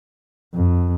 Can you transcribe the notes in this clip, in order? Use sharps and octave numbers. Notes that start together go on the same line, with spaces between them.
F2